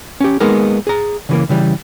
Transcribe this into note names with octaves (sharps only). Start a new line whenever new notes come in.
C#4 G4
G#3 A#3 B3 D#4 G#4 A#4
G#4 A#5
C#3 E3 A#3
C#3 E3 G3